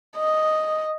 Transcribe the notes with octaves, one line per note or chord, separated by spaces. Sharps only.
D#5